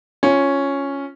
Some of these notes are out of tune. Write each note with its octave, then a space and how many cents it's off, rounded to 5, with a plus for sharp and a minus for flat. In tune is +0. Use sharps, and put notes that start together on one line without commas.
C#4 +0 F4 +0